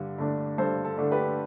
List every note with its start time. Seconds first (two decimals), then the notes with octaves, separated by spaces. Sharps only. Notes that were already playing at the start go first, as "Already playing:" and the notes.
Already playing: G2 D3
0.18 D3 A3 D4
0.58 G2 A4 C5
0.85 A4
0.98 D3 A3 D4
1.11 G4 B4